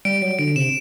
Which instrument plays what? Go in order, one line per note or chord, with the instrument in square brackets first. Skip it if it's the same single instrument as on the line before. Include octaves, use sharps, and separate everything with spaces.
[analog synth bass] G3 [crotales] D7
[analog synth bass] F#3 [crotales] D7
[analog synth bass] D3 [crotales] D7
[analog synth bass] C3 [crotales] E7